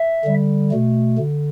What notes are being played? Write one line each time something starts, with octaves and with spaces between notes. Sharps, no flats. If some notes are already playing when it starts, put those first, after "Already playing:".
Already playing: E5
D3 G3
B2 A3
D3